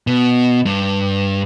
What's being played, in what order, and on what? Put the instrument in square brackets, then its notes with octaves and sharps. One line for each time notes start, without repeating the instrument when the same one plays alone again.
[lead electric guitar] B2
G2